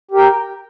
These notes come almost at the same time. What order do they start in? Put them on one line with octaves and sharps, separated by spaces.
G4 A#4 G5